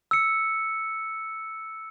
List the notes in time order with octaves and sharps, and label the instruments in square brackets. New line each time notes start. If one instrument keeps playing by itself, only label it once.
[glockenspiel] E6 C#7